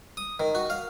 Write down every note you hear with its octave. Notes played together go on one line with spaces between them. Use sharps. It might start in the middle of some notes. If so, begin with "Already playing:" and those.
D#6
D#3
F#4
F5